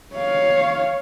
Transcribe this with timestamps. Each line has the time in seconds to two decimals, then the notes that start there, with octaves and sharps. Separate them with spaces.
0.16 C#5 F5